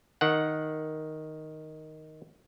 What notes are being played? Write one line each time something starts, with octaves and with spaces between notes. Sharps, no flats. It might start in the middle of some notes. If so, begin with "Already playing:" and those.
D#3 F#5